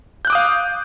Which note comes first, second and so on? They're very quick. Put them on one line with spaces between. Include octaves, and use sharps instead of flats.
G6 F#6 D6 D#6 F5